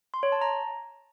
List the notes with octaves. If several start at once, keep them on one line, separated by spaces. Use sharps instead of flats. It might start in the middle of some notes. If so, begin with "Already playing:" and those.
C6
C#5
A5
A#5